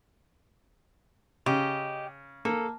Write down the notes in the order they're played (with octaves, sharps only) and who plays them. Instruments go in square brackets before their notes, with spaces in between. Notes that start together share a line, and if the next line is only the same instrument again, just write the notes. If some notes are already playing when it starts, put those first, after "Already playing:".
[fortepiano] C#3 [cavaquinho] G4 D#5
[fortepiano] A#3 [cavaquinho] A4